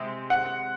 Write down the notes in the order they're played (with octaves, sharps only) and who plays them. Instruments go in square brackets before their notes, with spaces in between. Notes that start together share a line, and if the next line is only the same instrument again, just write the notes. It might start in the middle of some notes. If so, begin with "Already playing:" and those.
Already playing: [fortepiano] C3 G#3 C4
[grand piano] F#5